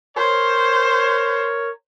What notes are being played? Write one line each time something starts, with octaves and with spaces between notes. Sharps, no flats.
A#4 C5 C#5